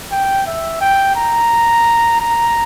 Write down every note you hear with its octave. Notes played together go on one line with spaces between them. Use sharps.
G5
E5
G5
A#5
A#5